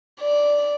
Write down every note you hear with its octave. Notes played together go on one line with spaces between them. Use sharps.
D5